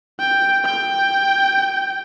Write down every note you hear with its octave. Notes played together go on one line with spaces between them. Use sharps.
G5
G5